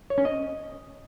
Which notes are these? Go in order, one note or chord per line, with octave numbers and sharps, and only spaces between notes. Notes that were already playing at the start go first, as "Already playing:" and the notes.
C#5
C#4
D#5